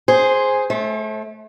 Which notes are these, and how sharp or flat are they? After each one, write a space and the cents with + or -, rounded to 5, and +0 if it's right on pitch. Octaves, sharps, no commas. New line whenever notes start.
G#4 +0 C5 +0
A3 -25 C5 +40